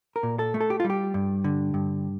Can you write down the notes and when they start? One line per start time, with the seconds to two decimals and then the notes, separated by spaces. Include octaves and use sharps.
0.16 A#4
0.23 A#2
0.39 A4
0.54 A3
0.61 A4
0.70 G4
0.80 F4
0.84 G3
0.90 G4
1.14 G2
1.44 D3
1.74 G2